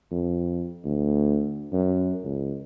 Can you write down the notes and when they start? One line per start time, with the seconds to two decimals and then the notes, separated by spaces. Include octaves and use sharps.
0.12 F2
0.84 D2
1.72 F#2
2.24 C#2